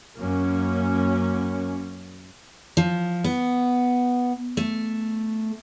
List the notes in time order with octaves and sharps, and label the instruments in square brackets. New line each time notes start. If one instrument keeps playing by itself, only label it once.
[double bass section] F#2 A#3 C#4
[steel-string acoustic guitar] F3
B3
A3